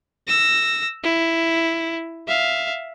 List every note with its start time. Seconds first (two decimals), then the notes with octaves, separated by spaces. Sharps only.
0.28 E6 A#6
1.03 E4
2.28 E5 F5